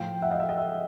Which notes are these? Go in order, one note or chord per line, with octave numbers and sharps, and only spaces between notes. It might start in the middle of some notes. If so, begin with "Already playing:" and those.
Already playing: A2 F3 F5 G5
E5 F#5
D#5 F5
E5
D#5
E5